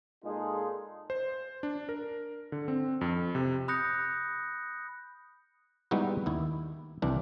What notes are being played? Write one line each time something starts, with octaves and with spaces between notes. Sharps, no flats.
A#2 G#3 D#4 F4 G#4 A4
C5
D4
A#4
D3
C4
F2
C3
B5 D#6 F#6 G6 A#6 C#7
G3 G#3 B3 D#4 E4 F#4
D#2 E4
C2 E3 D4